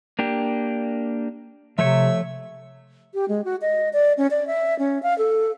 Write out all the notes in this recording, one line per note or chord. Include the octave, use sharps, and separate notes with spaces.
A#3 D4 G4
C3 F3 A3 C#5 E5
G4
G#3
F#4
D#5
D5
C#4
D5
E5
C#4
F5
A4